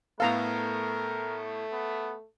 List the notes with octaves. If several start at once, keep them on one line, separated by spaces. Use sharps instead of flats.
A2 A3 B3 A4 A#4 F5 A#5
B3